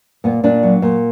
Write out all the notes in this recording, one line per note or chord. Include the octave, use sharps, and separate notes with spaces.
A#2 B3
A#2 D4
F#3
A#2